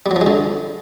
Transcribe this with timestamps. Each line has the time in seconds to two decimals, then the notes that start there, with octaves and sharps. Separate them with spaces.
0.06 G3
0.11 F#3
0.16 F3
0.21 G#3
0.26 D3